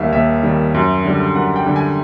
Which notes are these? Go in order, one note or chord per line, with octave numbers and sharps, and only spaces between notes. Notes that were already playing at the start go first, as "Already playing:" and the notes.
Already playing: D#2 D#3 G3 E5 F5
D#2 E5
D#3 G3
F#2
D3 G3
F#2 F#5
G5
D3 G3
G#5